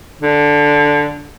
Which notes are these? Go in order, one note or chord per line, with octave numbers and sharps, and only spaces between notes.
D3